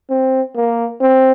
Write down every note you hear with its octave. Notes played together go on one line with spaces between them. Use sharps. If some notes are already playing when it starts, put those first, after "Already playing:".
C4
A#3
C4